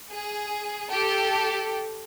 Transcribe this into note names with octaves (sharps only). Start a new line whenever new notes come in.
G#4
G4 A4